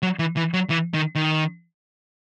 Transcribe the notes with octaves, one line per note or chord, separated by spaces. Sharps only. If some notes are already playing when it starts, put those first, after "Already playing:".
F#3
E3
E3
F#3
E3
D#3
D#3